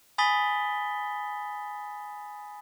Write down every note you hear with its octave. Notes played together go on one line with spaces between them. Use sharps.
G#5 B5 D#6 A6 B6 G7